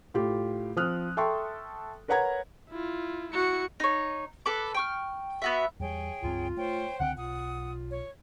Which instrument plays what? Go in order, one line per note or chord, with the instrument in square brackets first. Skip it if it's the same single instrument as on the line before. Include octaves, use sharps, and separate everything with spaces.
[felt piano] A2 F4 G4
F3 C4 D#6 F6 F#6
A4 E5 G5 C6 C#6
A#4 B4 C#5 F#5 A#5 G#6
[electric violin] E4 F4
[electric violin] E4 C#7 [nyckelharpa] F#4
[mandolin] D#4 C#5
A4 B4 D6
G5 C#6 F6
B3 F#4 E5
[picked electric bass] E2 G3 [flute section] G#4 C#5 G5
[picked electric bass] C#2 G2 C4 [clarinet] F4
[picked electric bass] A3 [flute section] C5 C#5 G5
[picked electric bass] C#2 D3 C4 [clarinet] F#5 [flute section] G5
[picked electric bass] B1 [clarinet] F4 [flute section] F#5 D#6
[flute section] C#5